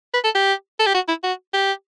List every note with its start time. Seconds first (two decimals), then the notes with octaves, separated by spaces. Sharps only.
0.14 B4
0.24 A4
0.35 G4
0.79 A4
0.86 G4
0.94 F#4
1.08 E4
1.23 F#4
1.54 G4